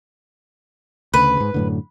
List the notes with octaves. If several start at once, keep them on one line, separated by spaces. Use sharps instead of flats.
D2 C#3 B4
G#2
F#2 A2 D3